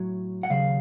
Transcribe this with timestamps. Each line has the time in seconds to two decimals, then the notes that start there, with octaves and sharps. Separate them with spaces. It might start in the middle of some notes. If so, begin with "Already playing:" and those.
Already playing: A2 F#3
0.43 F#5
0.50 D#2 C#3 F#3 F5